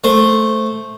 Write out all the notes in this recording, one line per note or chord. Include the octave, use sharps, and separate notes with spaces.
A3 C5